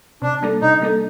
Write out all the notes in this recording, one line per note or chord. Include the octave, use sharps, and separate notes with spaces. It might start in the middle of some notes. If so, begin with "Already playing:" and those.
C3 D4
G3 A#3 D4 A4
C3 D#4
G3 A#3 D4 A4